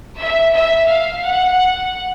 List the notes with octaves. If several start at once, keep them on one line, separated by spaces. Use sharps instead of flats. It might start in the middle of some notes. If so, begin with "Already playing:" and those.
E5
E5
F5
F#5